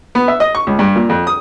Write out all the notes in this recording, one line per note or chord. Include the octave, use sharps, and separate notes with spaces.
B3
E5
D#5
C#6
C#2
G2
A#2
F2
D#6